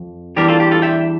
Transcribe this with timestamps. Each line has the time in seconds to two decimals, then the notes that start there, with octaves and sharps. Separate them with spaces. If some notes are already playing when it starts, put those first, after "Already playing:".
Already playing: F2
0.36 E2 E3 G3 D4 G4 A#4
0.48 F4 A4
0.60 G4
0.71 F4 A4
0.82 E5 G5